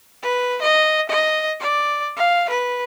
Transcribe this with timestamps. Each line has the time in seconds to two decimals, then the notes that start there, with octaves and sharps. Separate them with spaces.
0.23 B4
0.62 D#5
1.09 D#5
1.60 D5
2.16 F5
2.49 B4